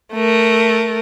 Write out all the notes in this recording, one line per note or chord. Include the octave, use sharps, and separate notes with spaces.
A3 A#4